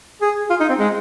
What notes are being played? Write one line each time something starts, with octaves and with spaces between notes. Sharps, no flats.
G#4
F4
D#4
C4
G#3